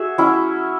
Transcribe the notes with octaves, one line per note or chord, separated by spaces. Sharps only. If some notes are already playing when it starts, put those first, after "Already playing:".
Already playing: F#4 G#4 E5
F#3 C#4 E4